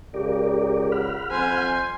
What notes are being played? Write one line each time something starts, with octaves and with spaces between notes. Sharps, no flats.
C#2 G4 A#4 D5
F#5 B5 F6
F2 C5 G#5